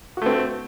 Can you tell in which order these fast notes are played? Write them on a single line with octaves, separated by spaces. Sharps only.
F#4 A3 C4